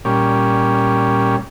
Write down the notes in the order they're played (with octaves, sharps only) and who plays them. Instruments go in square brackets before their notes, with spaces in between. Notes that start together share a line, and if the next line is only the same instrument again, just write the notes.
[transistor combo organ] A#2 G3 C#4